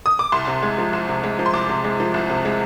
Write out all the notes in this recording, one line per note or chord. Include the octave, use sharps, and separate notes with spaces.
D#6
D6
C2 C6
C3
G#3
F3
C2
C3
G#3
F3
C6
C2 D6
C3
G#3
F3
C2
C3
G#3